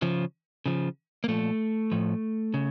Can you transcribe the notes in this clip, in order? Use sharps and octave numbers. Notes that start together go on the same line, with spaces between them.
C#3 F3
C#3 F3
A#3
A#2 F3 A3
A2 F3
C#3